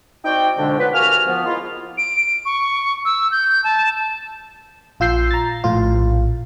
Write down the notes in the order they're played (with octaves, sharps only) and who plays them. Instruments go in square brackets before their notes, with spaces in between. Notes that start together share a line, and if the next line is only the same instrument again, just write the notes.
[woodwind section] C4 D#4 F#4 D5 G5
F2 G#2 B2 D3 G#3 D4
F#3 B3 F4 B4
C2 A#3 F#4 G#5 F6
F3 B3
G#3 A#3 E4 F4
[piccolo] D7
C#6
E6
G6
A5
[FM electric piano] A#1 F4 E6 G6 C7
A#5 A6
A#1 A2 F4